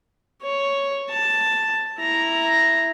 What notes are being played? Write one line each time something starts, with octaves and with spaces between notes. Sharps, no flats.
C#5
A5
E4 A#5